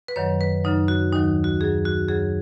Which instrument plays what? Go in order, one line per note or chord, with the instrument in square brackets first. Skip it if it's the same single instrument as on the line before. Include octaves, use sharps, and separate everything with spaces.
[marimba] B4
F#2 D#3 F#3 C#5
B4
F#2 C#3 F#3 D#4
F#4
D#2 D#3 F#3 D#4
F#4
F#2 F#3 G#4
F#4
F#2 C#3 F#3 G#4